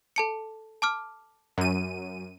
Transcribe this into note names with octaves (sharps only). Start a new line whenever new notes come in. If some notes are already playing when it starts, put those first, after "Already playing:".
A4 A5 C#7
A5 D6 F6
F#2 D#7